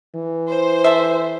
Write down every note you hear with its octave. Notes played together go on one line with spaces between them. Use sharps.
E3
C5
A4 E5